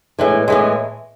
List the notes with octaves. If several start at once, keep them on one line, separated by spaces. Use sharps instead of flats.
A2 E3 G#3
A2 E3 G#3